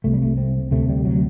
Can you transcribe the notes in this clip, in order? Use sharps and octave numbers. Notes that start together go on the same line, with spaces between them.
C2 C3 A3
G3
A3
C4
D2 C3 A3
G3
F#3